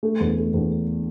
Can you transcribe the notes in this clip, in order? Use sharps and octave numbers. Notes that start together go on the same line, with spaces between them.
A3
E2
A3
E2
A3